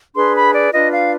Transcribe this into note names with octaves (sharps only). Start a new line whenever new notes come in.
D4 G#4 B4 C6
B5
D5
D4 F4 B4 D#5
F5